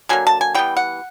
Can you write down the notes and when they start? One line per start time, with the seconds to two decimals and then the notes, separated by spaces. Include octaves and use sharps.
0.09 D3 F#3 A#3 G#5
0.27 A5
0.41 G#5
0.54 E3 G3 B3 G5
0.77 F#5